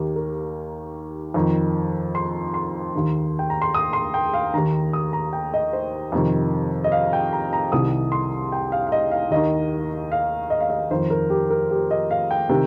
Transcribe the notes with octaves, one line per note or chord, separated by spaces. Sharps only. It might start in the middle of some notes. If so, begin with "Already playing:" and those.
Already playing: D#2 D#3 G4
A#4
F2 D#3
C6
C6
D#2 D#3
G5
A#5
C6
D#6
C6
G5
F5
D#2 D#3 A#5
D#6
A#5
G5
D#5
C5
F2 C3 D#3
D#5
F5
G5
A#5
A#5
C2 C3 D#3 D#6
C6
G5
F5
F5
D#5
F5
D#2 D#3 D#5
F5
D#5
F5
D#5
F2 D#3 C5
A#4
G4
A#4
G4
D#5
F5
G5
C3 D#3